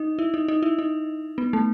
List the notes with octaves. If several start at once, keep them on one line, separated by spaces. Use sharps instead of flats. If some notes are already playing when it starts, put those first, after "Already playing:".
Already playing: D#4
E4
D#4
D#4
E4
D#4
B3
A3